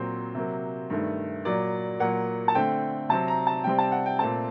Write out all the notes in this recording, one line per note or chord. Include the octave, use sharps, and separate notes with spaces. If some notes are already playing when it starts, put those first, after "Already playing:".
Already playing: A#2 F#3 C4 C5
C3 F#3 A#3
G2 D#3 A3
A#2 F#3 A#3 D5
A#2 F#3 A#3 F#5
A5
D3 A3 C4 G5
C3 F#3 C4 A5
A#5
A5
C3 G3 C4 G5
A5
F#5
G5
A#2 A3 C4 A5